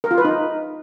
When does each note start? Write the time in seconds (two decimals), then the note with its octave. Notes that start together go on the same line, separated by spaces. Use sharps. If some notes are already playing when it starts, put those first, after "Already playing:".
0.04 A#4
0.11 F4
0.18 B4
0.25 D#4